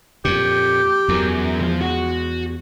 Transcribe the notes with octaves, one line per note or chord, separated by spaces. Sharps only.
F2 A#2 G4
E2 F#3 A#4
F3 G#3 F4
F#4